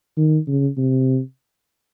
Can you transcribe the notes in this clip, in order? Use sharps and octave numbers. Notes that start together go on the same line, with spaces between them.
D#3
C#3
C3